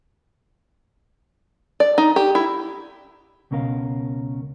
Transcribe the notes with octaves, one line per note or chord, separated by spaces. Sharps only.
D5
D#4
G4
E4
C#2 B2 C#4 A#4 F5